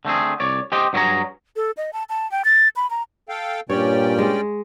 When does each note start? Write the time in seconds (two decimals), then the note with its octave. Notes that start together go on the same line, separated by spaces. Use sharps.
0.05 D3 A3 C4 G#4
0.40 C2 C#5 D5
0.72 G4 C5 D#5 G5
0.93 G2 F#3 F#4 G#4 C#5 A#5
1.56 A4
1.77 D#5
1.93 A5
2.09 A5
2.31 G5
2.45 A6
2.76 B5
2.90 A#5
3.29 A4 F5 G5
3.69 G2 A#2 C#4 C#5 D5 G5
4.18 G#3